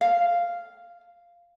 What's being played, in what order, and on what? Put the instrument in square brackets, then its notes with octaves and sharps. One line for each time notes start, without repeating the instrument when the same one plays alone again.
[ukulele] F5